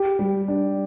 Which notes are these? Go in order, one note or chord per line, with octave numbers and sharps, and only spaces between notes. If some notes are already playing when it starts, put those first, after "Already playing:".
Already playing: G4
G3
D4